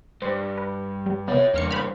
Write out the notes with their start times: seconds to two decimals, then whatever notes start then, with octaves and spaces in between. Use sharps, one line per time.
0.22 G2 C5
0.58 B4
1.06 G3
1.28 C3 B3 C#5 E5
1.54 E2 G2 A#3 F6 C#7
1.71 C5 B5 F6